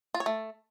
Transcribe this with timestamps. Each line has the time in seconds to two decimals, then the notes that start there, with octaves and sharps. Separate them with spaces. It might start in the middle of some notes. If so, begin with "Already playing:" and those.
0.14 F4
0.20 C#5
0.26 A3